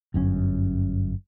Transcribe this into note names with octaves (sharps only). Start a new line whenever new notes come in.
G1 F#2 C#4